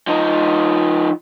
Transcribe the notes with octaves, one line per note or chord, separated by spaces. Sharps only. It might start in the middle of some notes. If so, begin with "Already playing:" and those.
F3 D#4